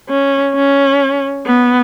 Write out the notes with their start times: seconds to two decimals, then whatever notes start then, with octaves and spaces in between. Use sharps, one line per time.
0.09 C#4
0.55 C#4
1.47 B3